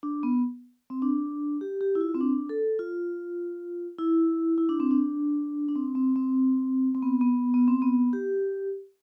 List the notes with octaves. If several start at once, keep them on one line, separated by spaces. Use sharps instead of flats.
D4
B3
C4
D4
G4
G4
E4
F4
C4
D4
A4
F4
E4
E4
D4
C4
D4
D4
C4
C4
C4
C4
B3
B3
B3
C4
B3
G4